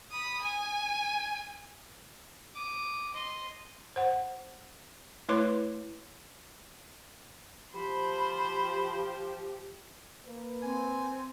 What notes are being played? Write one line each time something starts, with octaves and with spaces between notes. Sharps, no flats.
B5 D#6
G#5
D6 D#6
D#5 C6
C5 F#5
A3 E4 B4 C#5 C6 D6
F3 G4 C5 B5
A#3 B4
C4 G#5